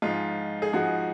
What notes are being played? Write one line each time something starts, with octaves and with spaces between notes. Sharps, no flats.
G#2 F3 G#3 F4
G#4
G#2 F3 G#3 F#4